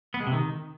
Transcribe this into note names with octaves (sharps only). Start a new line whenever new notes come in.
B3
G#3
C3
D#3